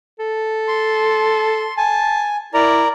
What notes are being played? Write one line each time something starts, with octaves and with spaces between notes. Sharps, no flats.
A4
C6
G#5 A5
E4 A#4 D5 A#5